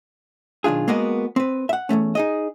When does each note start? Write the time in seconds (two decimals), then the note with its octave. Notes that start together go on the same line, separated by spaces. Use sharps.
0.64 B1 D#3 D4 F4 G#4
0.88 G#3 A#3 B3 F#4 A#4 D#5
1.36 C4 B4
1.69 E5 F#5
1.89 E2 G2 A3 C#4
2.15 D#4 G#4 D#5